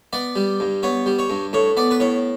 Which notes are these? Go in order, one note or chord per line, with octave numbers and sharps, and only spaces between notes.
B3 D5
G3
G2
B3 C#5
G3
C#5
G2
A2 C#5
B3 D5
B4
A2 C#5